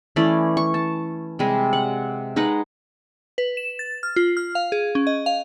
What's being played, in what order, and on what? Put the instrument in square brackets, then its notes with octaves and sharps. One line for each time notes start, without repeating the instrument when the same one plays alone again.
[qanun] E3 A3 C#4 D5
C#6
A5
C3 G3 G#3
F#5
G#3 D#4 B4 F#5
[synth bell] B4
E7
A6
F6
F4
F6
F5
G#4
C#4
D#5
F5